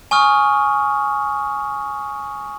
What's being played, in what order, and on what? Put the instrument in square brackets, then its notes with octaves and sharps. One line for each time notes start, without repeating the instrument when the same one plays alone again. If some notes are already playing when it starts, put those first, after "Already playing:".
[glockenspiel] G#5 C#6 D#6 F6